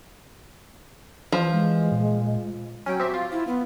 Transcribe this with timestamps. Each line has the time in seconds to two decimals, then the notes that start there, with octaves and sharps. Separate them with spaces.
1.32 E3 F3
1.51 G#3
1.91 A#2
2.86 F#3 C#4 G5
3.00 C4 G4 E5
3.14 F4
3.32 E4
3.47 B3